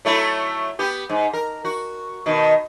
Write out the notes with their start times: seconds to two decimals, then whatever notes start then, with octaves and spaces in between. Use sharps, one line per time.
0.05 F#3 A3 E4
0.79 B3 G4
1.10 G#2
1.34 A#4
1.65 F#4
2.26 B2 D#3